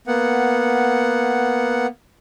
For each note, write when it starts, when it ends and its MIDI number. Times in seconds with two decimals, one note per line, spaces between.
0.07 1.86 58
0.07 1.86 59
0.07 1.86 78